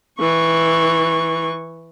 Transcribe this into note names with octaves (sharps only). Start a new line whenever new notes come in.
E3 C#6